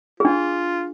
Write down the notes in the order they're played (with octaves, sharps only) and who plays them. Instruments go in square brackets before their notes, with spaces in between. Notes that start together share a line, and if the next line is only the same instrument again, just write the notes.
[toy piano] D4 G#4 [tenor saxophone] F4